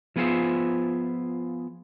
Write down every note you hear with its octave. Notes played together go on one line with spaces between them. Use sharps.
F3 B3 F4 G#4 C5 E5